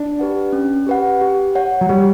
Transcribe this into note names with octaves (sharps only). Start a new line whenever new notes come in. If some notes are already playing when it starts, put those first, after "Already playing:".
Already playing: D4
G4 B4 F#5
C#4
G4 B4 F#5
G4
C#5 F#5
F#3
G3 G4